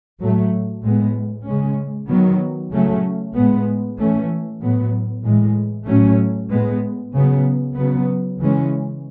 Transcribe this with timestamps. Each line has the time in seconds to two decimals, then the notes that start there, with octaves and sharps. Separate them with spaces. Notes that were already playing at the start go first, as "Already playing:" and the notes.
0.19 A2 F#3 A3
0.83 A2 G#3 B3
1.45 C#3 G#3 C#4
2.09 D#3 F#3 B3
2.72 C#3 F#3 A3 C#4
3.35 A2 G#3 B3
3.98 E3 A3 C#4
4.61 A2 F#3 B3
5.24 A2 E3 G#3
5.87 A2 F#3 A3 C#4
6.51 A2 G#3 B3
7.13 C#3 F#3 B3
7.76 C#3 F#3 B3
8.39 C#3 E3 G#3 C#4